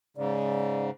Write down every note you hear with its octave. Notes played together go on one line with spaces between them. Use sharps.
G#2 C#3 D5